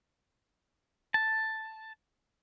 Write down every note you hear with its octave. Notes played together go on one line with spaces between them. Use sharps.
A5